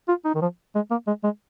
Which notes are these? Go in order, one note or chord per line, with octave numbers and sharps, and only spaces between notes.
F4
D#4
D#3
F3
G#3
A#3
G#3
G#3